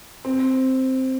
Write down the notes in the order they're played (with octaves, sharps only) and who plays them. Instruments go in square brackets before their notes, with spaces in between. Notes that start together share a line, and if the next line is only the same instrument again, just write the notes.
[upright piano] C4